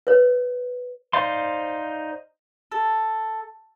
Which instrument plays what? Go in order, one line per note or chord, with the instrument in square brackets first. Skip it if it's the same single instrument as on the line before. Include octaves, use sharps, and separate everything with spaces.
[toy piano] B4 C#5
[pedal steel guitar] D#4 C5 D5 F5 C6
[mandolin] A4